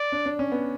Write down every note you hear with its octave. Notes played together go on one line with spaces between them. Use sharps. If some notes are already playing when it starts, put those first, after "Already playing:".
Already playing: D5
D4
D4
C#4
B3